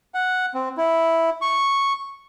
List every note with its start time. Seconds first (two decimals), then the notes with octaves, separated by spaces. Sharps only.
0.14 F#5
0.54 C4
0.78 E4
1.42 C#6